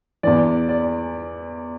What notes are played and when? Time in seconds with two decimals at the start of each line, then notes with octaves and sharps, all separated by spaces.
0.23 E2 E3 D5
0.69 D5